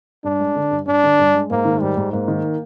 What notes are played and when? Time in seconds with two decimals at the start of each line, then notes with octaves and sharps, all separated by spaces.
0.24 G2 D4
0.40 G#3
0.56 D3
0.71 G2
0.87 G2 D4
1.04 D3
1.19 G2
1.35 G#3
1.51 G#2 A#3
1.65 D#3
1.81 G#2 G3
1.97 G#2
2.12 G#2 A#3
2.28 D#3